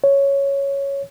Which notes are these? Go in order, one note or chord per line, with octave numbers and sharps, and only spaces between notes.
C#5